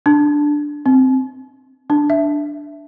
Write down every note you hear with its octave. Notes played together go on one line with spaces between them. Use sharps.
D4
C4
D4
E5